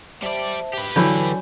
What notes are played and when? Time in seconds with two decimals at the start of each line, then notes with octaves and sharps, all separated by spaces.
0.22 G3 C5 D5 E5 A5
0.73 G4 B4
0.96 D3 E3 F#3 D5 G#5 B5 G6